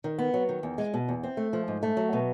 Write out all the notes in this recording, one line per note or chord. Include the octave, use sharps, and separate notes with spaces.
D#3
B3
F#3
D#3
E2
G#3
B2
E2
C4
A3
F3
G#2
A3
F#3
B2